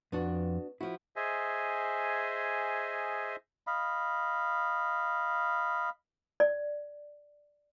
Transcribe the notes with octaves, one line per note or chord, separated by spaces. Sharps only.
F2 B3 D4 F#4
F3 E4 F#4
G#4 C5 D#5 E5 G#5
D#5 F5 B5
D5